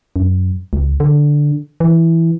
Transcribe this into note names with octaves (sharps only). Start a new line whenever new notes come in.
F#2
C#2
D3
E3